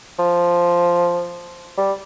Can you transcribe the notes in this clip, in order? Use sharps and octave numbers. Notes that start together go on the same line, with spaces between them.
F3
G3